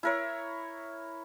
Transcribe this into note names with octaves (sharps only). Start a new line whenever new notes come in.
E4 A#4 C#5